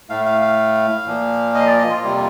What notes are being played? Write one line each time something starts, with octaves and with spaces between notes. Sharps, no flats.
A2 A3 F5
F5
F5
A#2 F3 A#3
D#5
D5
D#5
F4
F2 C3 G3 A#3